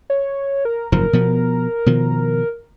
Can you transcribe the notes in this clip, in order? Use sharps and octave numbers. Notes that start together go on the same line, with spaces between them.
C#5
A#4
F#1 G#2 F3 A#4
B2 F3 B3
B2 D#3 F3